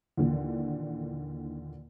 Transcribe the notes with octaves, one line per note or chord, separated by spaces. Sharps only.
D#2 A#2 D3 E3